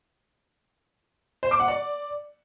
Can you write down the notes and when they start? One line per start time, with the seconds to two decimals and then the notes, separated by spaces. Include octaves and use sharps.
1.43 C5
1.51 D6
1.60 F#5
1.68 D5